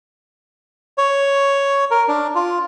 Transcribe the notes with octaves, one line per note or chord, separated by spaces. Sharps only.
C#5
A#4
D4
F4